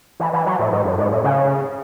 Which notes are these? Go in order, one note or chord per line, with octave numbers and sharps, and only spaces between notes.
E3
E3
F#3
A2
G#2
F#2
G#2
A2
C#3